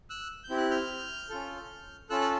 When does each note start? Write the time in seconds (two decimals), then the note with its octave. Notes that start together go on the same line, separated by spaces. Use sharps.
0.10 E6 F#6
0.44 G6
0.49 C4 E4 G4
0.57 F#6
0.70 F6 G6
1.29 C#4 F4 A4
2.10 C#4 F4 A4 E6 F#6
2.21 E6